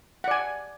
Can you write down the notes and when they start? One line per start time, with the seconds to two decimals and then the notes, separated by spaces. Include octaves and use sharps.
0.24 F#5
0.28 D5
0.31 G#5